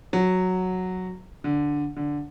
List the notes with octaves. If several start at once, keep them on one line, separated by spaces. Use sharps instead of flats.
F#3
D3
D3